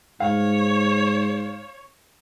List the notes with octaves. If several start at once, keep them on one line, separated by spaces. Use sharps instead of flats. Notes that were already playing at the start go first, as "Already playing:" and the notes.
G#2 C#5 F5